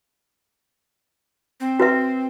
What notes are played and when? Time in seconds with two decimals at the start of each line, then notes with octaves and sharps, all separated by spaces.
1.60 C4
1.80 F#4 B4 E5